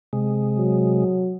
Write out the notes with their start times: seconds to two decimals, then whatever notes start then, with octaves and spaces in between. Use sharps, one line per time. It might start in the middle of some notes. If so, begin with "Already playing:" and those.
0.13 C3 G#3
0.58 F#3